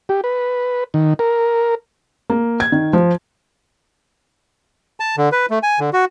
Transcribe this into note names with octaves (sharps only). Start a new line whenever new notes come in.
G4
B4
D#3
A#4
A#3
G#6
D#3
F3
A5
D3
B4
A3
G#5
D3
F#4